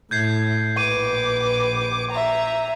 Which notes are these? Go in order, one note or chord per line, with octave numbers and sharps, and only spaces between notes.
A2 G6 G#6 C7
A#1 B4 D6 D#7
E5 A#5